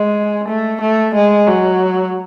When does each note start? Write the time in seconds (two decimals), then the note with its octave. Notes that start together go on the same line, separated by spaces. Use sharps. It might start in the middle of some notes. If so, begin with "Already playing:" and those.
Already playing: G#3
0.48 A3
0.81 A3
1.14 G#3
1.47 F#3